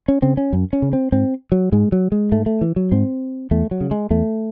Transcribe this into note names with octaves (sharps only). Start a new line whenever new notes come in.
C#4
C#3 C4
C#4
F#2
C#4
C#3
C4
G#2 C4
F#3
G#2 G#3
F#3
G#3
G#2 A3
A3
E3
F#3
G#2 C4
E2 A3
F#3
C#3
G#3
E2 A3